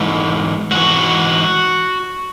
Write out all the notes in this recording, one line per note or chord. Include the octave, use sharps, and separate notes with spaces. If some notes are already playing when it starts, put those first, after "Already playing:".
Already playing: G#2 E3
G#2 E3 F#4